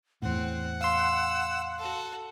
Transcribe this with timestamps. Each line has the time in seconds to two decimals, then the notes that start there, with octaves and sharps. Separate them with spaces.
0.22 E2 A2 C4 F#5
0.81 F5 C6 E6
1.78 F#4 A4